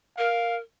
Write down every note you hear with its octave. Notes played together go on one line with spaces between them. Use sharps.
A#4 F5